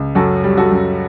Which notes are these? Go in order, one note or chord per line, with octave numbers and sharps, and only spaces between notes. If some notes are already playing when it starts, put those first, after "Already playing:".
Already playing: C#2
F#2 F#4 A4
G3
F#4 A4
F#2